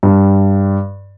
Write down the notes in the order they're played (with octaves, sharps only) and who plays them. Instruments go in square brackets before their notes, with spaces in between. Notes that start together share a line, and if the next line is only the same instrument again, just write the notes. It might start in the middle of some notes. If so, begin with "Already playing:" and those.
[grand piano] G2